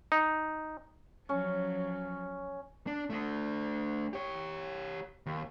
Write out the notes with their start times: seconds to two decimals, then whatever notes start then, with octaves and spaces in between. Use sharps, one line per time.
0.12 D#4
1.29 F3 F#3 C#4
2.87 D4
3.10 A3 D4
4.13 G4 C#5
5.26 D#2